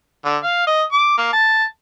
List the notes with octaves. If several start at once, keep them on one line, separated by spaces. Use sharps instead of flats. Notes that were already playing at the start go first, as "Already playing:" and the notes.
D3
F5
D#5
D6
A#3
A5